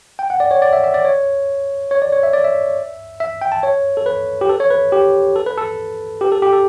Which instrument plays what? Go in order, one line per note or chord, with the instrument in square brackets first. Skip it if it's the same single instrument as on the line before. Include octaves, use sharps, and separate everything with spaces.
[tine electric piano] G5
F#5
D5
C#5
D5
E5
E5
D5
C#5
C#5
D5
C#5
E5
D5
E5
E5
G5
A5
C#5
A4
B4
G4
A4
C#5
B4
G4
A4
B4
A4
G4
A4
G4
A4